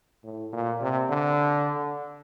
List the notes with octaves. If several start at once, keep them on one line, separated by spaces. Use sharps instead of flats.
A2
A#2
C3
D3